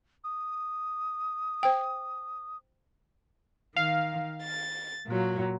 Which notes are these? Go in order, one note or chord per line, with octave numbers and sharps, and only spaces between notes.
D#6
C5 G5
D#3 F5
A6
A#2 F#3